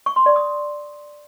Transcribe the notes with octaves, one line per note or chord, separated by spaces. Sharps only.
C#6
C6
D5
D#6